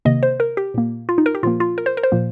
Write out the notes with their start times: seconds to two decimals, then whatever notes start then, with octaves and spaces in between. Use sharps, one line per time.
0.05 C3 D#3 A#3 D#5
0.23 C5
0.40 A#4
0.57 G4
0.74 A#2 A#3
1.09 F4
1.18 D#4
1.26 A#4
1.35 G4
1.43 A#2 F3 A#3 F4
1.60 F4
1.78 A#4
1.86 C5
1.97 A#4
2.03 C5
2.12 A#2 F3 A#3